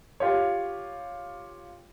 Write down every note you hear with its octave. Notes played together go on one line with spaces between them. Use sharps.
F4 G4 C#5